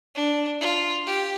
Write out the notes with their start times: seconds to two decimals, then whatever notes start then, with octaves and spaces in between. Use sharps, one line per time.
0.15 D4
0.61 F4
1.07 G4